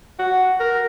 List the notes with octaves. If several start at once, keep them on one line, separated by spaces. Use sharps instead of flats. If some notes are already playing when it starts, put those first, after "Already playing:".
F#4
A#4